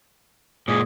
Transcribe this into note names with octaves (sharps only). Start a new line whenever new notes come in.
A#2 G#3 G#4